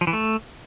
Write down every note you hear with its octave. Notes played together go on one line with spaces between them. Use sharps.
F3
E3
A3